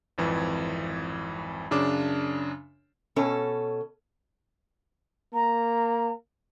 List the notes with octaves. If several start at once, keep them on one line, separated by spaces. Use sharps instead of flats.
G#1 F2 E3
F#2 C#3 D4 D6 E7
B2 C#4 A4
A#3 A#5